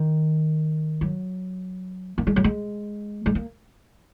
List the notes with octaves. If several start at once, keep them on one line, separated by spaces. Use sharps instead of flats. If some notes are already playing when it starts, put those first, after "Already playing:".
Already playing: D#3
F#3
A#3
G#3
F#3
G#3
G#3
A#3